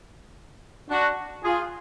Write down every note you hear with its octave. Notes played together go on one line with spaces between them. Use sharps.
D4 F#4
F4 G#4